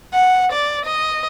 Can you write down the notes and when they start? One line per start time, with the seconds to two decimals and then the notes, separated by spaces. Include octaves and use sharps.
0.14 F#5
0.52 D5
0.85 D#5